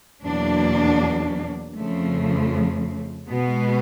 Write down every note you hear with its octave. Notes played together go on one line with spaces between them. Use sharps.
E2 B2 F#3 A#3 D4
F2 C#3 F3 A3
B2 G#3 B3